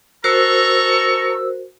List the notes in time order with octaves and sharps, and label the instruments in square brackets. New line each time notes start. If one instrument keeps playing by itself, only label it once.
[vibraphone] F#4 A#4 C5 [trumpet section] A4 A#5 C#6 [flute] E6